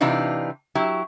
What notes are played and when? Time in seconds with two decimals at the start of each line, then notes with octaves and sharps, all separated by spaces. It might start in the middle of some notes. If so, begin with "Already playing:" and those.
0.01 C3 E3 D4 D#4 F4
0.75 F#3 E4 G4